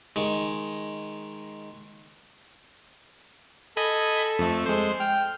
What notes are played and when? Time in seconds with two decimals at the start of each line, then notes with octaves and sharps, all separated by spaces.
0.16 D#3 G#3
3.77 A4 D#5 G#5 B5
4.39 F2 A3
4.66 G#3 C5
5.00 G5 F6